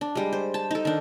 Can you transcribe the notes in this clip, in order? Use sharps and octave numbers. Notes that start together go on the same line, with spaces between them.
D4
G3 G#3
C5
A5
D#4 A4
D#3 D4